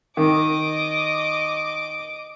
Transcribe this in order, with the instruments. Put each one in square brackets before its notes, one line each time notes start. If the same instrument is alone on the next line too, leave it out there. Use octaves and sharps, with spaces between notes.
[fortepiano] D#3 [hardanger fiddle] D#5 D6